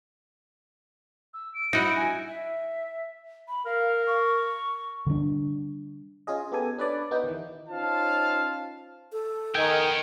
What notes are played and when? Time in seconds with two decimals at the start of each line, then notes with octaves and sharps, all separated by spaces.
1.34 E6
1.54 D7
1.73 D#4 E4 F#4
1.96 G#5
2.28 E5
3.48 B5
3.66 A#4 F5
4.07 C#6
5.07 D3 G3 G#3 D4
6.27 C#4 F4 G#4 D#5
6.52 B3 G4 A4 G#5
6.78 D4 B4 C#5 D5
7.11 B3 D#4 G4 B4 G5
7.24 D#3 E3
7.69 C#4 D#4 F4 C5 F5 A5
9.12 A4
9.55 D#3 B3 G5 G#5